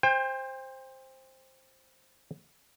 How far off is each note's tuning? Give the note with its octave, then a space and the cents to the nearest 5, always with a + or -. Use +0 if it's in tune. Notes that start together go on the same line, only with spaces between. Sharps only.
C5 +10 G5 +35